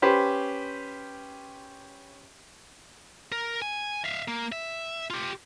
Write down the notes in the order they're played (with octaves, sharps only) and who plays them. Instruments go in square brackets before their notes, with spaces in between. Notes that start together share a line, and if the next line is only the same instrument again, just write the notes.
[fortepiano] C#4 G4 B4 C5
[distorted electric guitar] A#4
G#5
E5 F5
A#3
E5
F4 G4